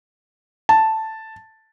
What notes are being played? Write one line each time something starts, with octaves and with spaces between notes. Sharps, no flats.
A5